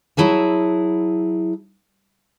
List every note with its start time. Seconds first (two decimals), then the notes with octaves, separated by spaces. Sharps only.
0.17 F#3 E4 G#4 A5